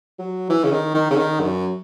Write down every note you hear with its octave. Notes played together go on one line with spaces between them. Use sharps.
F#3
E3
C#3
D#3
D#3
C#3
D#3
F#2